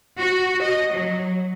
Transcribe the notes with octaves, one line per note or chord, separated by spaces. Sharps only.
F#4
D#5
F#3